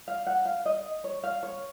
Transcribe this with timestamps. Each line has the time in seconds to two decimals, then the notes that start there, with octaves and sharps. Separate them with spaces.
0.08 F5
0.27 F#5
0.45 F5
0.66 D#5
1.04 C#5
1.24 F5
1.43 C#5